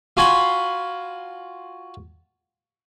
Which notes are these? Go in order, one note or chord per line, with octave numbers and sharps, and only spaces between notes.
F4 F#4 G#5 B5 C6